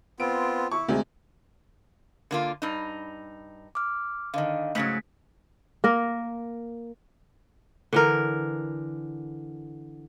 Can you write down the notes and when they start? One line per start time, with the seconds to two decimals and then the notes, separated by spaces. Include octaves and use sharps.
0.20 B3 C4 F4 D7
0.72 E4 C#6
0.88 D2 C3 G#3
2.31 D3 A#3 F4
2.62 G2 D#4
3.75 D6 F6
4.34 D3 D#3 D#5 F5
4.75 G#2 C#3 F#3 A3 B6
5.84 A#3 A#4
7.93 D3 E3 A#4